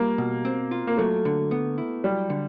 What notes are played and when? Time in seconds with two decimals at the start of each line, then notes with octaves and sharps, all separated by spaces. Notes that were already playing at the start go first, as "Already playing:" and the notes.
Already playing: G3 A#3 F4
0.18 B2
0.45 C4
0.71 F4
0.87 A#3
0.98 F#3 A3
1.25 D3
1.51 B3
1.78 E4
2.04 F#3 G3
2.30 D3